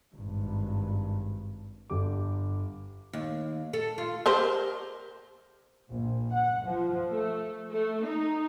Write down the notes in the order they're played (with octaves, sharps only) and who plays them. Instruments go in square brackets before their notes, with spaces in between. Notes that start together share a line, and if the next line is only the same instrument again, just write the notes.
[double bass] G#1 G2
[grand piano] G1 D3 G4 D6
[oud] D#2
A4
F4
[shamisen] G4 A#4 C5
[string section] A#1
F#5
F3
A3
A3
D#4